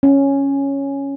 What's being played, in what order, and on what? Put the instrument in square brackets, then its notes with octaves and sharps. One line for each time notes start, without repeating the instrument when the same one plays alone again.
[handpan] C#4